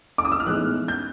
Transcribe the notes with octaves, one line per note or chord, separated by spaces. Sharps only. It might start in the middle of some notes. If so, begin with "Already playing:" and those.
D6
D#6
E6
F6
A2 E3 G#3 B3 D#4 F#6
G6